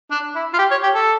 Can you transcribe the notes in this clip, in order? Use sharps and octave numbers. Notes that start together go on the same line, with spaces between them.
D4
E4
F4
G4
C#5
G4
A4